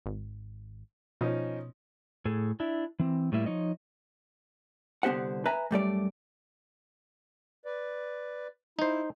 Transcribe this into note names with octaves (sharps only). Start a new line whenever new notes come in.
G#1
B2 F3 C#4 D#4
A2 G#4 A4
D4 E4 E5
E3 C4
A2 G3 A#3 E4
F3 D#4 C#5 D#5
C2 D3 B3 G4 C5 F#5
B4 E5 G#5 A#5
F#2 G3 A3 D5
B4 D5
D#4 E4 C5